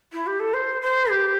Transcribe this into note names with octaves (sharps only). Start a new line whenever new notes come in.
E4
G4
A4
C5
C5
G4